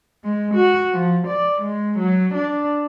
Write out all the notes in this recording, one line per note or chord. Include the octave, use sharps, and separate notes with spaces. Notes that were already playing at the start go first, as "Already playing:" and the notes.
G#3
F#4
F3
D5
G#3
F#3
D4